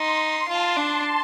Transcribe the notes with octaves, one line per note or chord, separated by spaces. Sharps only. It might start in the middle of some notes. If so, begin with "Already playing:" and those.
Already playing: D#4 C6
C6
F4 A5
D4